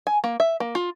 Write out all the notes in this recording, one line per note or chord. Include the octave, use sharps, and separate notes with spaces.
G#5
A#3
E5
A#3
F4